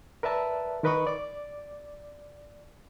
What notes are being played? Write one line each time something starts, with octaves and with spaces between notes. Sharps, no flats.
A#4 B4 D5 E5 A5
D#3 A#4 B4 D#5 B5 C#6
D5 D6